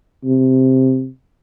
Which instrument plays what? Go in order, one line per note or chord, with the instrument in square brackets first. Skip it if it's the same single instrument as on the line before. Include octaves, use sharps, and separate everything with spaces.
[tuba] C3